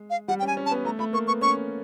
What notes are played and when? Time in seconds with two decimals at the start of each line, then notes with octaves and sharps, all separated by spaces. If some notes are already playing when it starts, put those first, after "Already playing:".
Already playing: G#3
0.10 F5
0.28 G3 F#5
0.39 G5
0.42 C#4 G#5
0.57 C#4
0.66 A5
0.71 B3
0.85 A3 A#5
0.99 A3 B5
1.13 A#3 C#6
1.27 B3 C#6
1.41 C#4 C#6